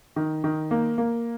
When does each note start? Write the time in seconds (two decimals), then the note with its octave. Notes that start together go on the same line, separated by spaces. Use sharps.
0.16 D#3
0.44 D#3
0.71 A#3
0.98 A#3